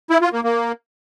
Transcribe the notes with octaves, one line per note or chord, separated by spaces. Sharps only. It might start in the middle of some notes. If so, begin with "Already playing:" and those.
E4
F4
A#3
A#3